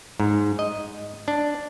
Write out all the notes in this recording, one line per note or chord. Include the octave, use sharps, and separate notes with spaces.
G#2
D#5
D4